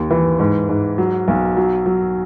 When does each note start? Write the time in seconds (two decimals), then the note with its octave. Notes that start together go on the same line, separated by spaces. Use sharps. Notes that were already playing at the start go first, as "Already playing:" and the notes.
Already playing: D#2
0.10 E3
0.39 G#2
0.69 G#2
0.98 F#3
1.28 B1
1.57 F#3
1.86 F#3